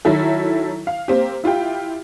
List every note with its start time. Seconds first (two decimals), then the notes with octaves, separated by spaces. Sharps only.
0.05 D#3 F#3 E4 A4
0.87 F5
1.08 A#3 C4 G4
1.44 E4 F4 G4 G5